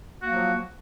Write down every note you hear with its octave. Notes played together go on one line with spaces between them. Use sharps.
F3 F#3 A#3 F#4